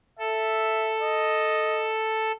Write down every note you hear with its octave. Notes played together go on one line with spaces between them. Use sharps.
A4 E5
D#5